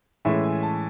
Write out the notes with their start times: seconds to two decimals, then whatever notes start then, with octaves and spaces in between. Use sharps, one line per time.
0.25 A2 E3 G#3 C#4 E5
0.43 G#5
0.63 A5